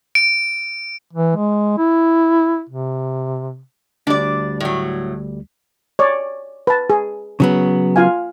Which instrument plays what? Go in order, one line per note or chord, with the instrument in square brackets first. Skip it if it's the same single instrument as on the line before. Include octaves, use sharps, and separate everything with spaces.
[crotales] D7
[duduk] E3
G#3
E4
C3
[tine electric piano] D2 G3 [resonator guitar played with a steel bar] D4 D5
[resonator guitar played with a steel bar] A2 F#3
[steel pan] C#5 D5
B4 A5
G#4
[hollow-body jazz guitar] C#3 F#3 B3
[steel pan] F4 F5 G#5